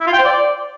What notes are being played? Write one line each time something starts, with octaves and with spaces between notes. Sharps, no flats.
E4
F4
G5
C5
D5